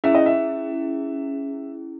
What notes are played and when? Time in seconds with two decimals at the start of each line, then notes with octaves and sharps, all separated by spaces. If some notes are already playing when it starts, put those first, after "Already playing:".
0.04 C#4 E4 G#4 E5
0.14 D#5
0.26 E5